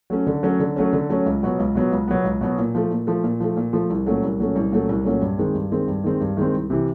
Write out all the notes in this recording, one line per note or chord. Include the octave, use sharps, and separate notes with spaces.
F#3 A3 C#4
D3
F#3 A3 C#4
D3
F#3 A3 C#4
D3
F#3 A3 C#4
C#2
B2 F#3 B3
C#2
B2 F#3 B3
C#2
B2 F#3 B3
C#2
B2 F#3 B3
A#2
F3 A3
A#2
F3 A3
A#2
F3 A3
A#2
F3 A3
C2
A#2 F#3 A3 C#4
C2
A#2 F#3 A3 C#4
C2
A#2 F#3 A3 C#4
C2
A#2 F#3 A3 C#4
G2
D#3 G#3 C4
G2
D#3 G#3 C4
G2
D#3 G#3 C4
G2
D#3 G#3 C4
C2
C3 E3